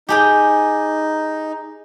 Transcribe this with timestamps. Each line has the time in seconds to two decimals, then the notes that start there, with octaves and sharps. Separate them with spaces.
0.09 D#4 G4 G#4 G5